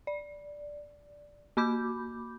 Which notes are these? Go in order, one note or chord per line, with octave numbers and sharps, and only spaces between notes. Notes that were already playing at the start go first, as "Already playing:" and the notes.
D5
A#3 F#4 B5 D6 G6